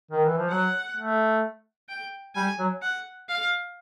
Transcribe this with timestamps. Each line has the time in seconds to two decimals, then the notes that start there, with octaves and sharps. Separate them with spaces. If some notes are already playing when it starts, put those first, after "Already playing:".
0.11 D#3
0.25 E3
0.37 F3
0.50 F#3 F#5
0.97 A3
1.89 G5
2.35 G3 G#5
2.59 F#3
2.82 F#5
3.29 F5